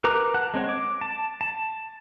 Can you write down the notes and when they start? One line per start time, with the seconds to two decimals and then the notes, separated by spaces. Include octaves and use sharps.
0.04 A#4 B4 A#5 D6 F#6
0.34 F#5 A5 F#6
0.54 G#3 C4 C#5
0.69 D6
1.01 A5
1.41 A5